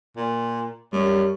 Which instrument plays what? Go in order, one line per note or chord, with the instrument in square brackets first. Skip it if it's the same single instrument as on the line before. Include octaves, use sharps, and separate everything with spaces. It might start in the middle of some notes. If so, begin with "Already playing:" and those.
[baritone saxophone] A#2
[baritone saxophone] F#2 [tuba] G3